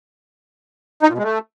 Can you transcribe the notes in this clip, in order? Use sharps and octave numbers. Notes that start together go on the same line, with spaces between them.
D#4
A#2
B2
G#3
A3